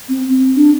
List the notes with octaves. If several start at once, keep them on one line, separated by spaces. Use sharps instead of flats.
C4
D4